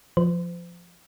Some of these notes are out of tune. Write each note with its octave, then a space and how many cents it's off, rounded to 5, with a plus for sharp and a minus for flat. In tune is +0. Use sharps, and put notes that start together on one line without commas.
F3 +0 C5 -40